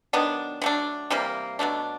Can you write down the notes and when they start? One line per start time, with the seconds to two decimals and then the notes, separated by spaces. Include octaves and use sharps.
0.13 D#3 F#3 B3 D4
0.62 F#3 A3 D4
1.10 C3 E3 G3 A#3
1.59 B2 F#3 A3 D4